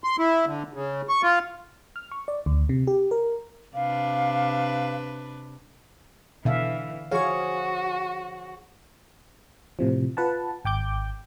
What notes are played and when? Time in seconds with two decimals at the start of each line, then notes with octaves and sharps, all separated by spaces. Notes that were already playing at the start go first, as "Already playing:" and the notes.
0.04 C6
0.19 E4
0.46 D3
0.74 C#3
1.09 C#6
1.23 F4
1.96 F6
2.12 C#6
2.28 D5
2.46 D2
2.69 C3
2.87 G4
3.11 A#4
3.75 C3 D4 B4 F5
6.45 B2 D3 E3 E5 F5
7.11 F3 F#4 G#4 C#5 F5 C#6
9.79 A2 C3 F3
10.17 F4 B4 F#5 A5
10.65 G#1 G5 D6 G6